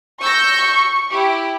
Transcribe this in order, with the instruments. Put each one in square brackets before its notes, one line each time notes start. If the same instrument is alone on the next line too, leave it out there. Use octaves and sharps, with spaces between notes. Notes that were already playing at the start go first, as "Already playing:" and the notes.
[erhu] C#6 [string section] E6 G6 A#6
[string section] E4 G4